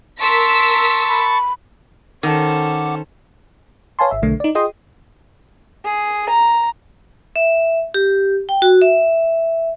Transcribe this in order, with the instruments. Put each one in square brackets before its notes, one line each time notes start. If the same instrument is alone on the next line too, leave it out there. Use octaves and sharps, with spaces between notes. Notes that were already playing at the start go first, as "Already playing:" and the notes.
[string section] A#4 E6 B6 [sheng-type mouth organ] A5 C#6 [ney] C6
[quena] B5
[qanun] D#3 [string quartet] C#4 A4 C5 [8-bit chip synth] F#5 D6
[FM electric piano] B4 C#5 F5 G#5 A5 C6
G#1 E5
B1 D3 A3
D#4 D5
F4 G#4 D#5 G5 C6 D#6
[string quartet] G#4
A#5
[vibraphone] E5
G4
G5
F#4
E5